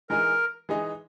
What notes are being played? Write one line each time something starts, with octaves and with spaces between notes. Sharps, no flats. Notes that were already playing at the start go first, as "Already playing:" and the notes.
E3 G#3 D#4 G#4 A#4
E3 G#3 D#4 G#4